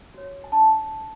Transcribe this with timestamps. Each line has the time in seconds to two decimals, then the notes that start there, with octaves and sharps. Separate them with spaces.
0.14 F#4 C#5
0.44 G#5
0.52 D4 A5